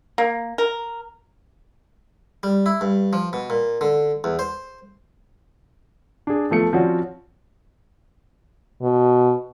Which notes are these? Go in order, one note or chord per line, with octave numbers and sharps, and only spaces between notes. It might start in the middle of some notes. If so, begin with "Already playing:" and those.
A#3
A#4
G3
E4
G2
F3
B2
A#2
D3
E2
C5
D4 G#4
E2 F3 A3 C#7
F3 C4 C#4 F#4 D5
B2